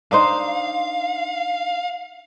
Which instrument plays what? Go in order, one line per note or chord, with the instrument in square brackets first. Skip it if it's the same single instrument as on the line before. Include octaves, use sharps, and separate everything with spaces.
[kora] D4 D#4 C5 [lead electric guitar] F5